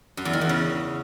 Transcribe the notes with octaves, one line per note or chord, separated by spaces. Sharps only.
F#2
E2
D#3
E2
C#3